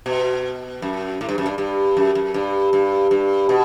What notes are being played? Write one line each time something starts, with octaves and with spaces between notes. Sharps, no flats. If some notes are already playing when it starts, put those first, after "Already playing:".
B2
F#2
A2
G2
F#2
G2
G2
F#2
F#2
G2
G2
G2
B2